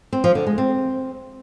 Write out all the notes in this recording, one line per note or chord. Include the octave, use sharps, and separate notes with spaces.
C4
F3
D3
G#3
C4